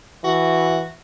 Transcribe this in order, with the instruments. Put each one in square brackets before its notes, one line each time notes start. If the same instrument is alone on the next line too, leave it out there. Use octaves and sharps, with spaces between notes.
[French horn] E3 [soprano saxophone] F#4